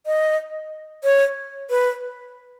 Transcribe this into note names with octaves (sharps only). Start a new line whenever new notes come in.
D#5
C#5
B4